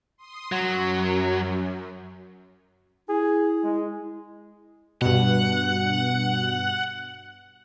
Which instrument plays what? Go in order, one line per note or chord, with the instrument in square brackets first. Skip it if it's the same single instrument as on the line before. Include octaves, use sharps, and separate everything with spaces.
[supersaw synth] C6 D#6
[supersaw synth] F#2 [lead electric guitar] F#3
[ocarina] E4 [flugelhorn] G#4
[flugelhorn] G#3
[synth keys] G2 B2 [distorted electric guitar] F#5